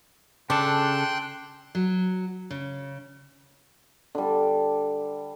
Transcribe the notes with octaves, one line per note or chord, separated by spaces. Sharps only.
C#3 D4 A4 G5 C6 F#6
F#3
C#3
D3 G3